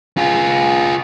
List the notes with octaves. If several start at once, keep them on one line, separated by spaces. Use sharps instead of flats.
F4 G#4